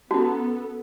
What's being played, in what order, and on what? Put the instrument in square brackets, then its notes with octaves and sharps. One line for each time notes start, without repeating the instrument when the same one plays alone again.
[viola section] B3 A4 [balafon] C#4 A5 [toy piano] F#4